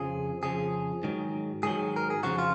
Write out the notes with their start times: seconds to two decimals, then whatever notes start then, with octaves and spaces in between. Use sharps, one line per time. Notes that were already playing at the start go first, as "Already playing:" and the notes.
Already playing: F2 C#3 F3 G#4
0.43 F2 C#3 F3 G#4
1.03 G#2 D#3 F#3
1.63 G#2 D#3 F#3 G#4
1.96 A#4
2.10 G#4
2.23 F2 C#3 F3 F#4
2.38 F4